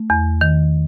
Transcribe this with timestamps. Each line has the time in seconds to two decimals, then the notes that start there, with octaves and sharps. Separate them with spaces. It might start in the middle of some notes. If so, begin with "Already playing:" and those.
Already playing: A3
0.10 E2
0.41 D#3